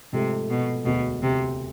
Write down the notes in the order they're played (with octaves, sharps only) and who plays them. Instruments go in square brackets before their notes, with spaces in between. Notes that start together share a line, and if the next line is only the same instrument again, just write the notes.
[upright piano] G#2 F3 A3 [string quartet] C3
[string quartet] B2
[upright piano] E1 D2 D3 [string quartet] B2
[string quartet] C3